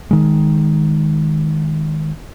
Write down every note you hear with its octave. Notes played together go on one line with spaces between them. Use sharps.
D#3 G#3